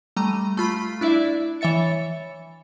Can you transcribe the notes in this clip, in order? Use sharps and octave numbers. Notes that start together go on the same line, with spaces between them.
G3 A3 A#5 D#7
A3 F4 B5
D4 E4 D5 E5
E3 C#5 E5 A6 C#7